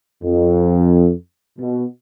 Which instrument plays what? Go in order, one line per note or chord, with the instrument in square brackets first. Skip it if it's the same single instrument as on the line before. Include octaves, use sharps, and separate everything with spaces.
[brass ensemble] F2
B2